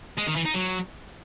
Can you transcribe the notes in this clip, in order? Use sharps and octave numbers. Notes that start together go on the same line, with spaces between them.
G#3
D#3
E3
D#4
F#3